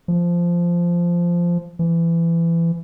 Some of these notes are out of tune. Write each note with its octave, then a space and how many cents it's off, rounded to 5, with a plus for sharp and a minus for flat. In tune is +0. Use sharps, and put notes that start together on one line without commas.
F3 -10
E3 +25